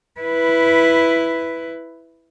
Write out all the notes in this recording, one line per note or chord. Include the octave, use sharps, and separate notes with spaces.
E4 B4